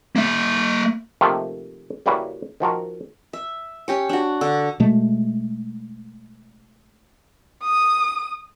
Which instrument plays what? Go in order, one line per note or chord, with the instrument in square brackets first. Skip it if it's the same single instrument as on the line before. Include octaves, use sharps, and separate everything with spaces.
[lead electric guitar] A#3 E5
[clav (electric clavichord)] C3 D#3 F3 A3 A#3 F4
C#3 G3 A#3 E4 F#4 B4
D#3 F3 F#4 A#4
[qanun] E5
C#4 G4 C#5
D4 F#4
D3
[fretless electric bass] B2 G#3 A3
[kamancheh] D#6